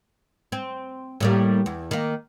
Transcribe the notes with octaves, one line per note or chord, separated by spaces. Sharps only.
C4
A2 G3 A#3
E2
D#3 A#3